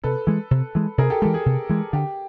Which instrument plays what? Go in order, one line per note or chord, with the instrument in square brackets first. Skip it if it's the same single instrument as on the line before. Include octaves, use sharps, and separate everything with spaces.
[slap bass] C3 [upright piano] A4 B4
[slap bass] E3 G#3
C3
E3 G#3
[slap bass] C3 [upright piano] G#4 A#4
[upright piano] G4 A4
[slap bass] E3 G#3 [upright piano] G4 A4
[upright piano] G#4
[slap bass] C3
E3 G#3
[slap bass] D3 [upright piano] G4